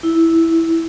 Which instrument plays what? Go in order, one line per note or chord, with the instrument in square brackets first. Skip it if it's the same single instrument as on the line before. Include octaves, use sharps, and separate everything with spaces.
[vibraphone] E4